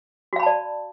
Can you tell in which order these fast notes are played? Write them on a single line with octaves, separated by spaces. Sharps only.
F#4 F5 B5 A5 D5